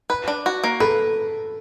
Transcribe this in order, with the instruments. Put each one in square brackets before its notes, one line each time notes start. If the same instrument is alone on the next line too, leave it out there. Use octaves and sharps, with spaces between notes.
[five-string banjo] B4
D4
F#4
A#3
[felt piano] A4 [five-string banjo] B4